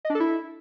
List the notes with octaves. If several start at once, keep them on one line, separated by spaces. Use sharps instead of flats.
D#5
D4
A4
E4